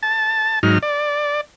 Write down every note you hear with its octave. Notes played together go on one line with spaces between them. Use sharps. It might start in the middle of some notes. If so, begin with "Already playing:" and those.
A5
G#2 F#3 D#4 F6
D5